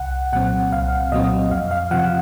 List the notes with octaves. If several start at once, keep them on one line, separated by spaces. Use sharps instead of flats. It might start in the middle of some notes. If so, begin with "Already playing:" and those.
Already playing: C2 F#5
A#2 F#3 C4 F#5
C2 F5
A#2 F#3 C4 D#5
F2 F5
F5
C3 F3 F#5